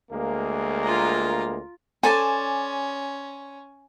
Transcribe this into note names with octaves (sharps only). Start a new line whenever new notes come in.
D2 G#3 A#3
F4 A#5
C#4 A4 C5 D5 G#5 A5